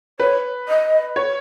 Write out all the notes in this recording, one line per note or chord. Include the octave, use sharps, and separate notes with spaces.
B4 C#5
D#5
C#5